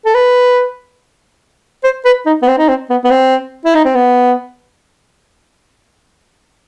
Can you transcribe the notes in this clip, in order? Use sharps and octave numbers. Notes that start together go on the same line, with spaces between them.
A4
B4
C5
B4
D#4
B3
C4
D#4
C4
B3
B3
C4
E4
D#4
C4
B3